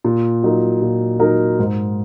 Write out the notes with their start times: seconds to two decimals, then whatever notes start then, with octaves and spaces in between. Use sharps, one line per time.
0.04 A#2
0.43 F#3 D#4 A#4
0.81 A#2
1.20 F#3 D#4 A#4
1.59 G#2